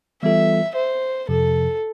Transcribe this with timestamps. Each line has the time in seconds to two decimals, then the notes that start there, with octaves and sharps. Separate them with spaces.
0.23 E3 G3 B3 F4 A4 E5
0.76 C5
1.29 F2 C3 F3 A4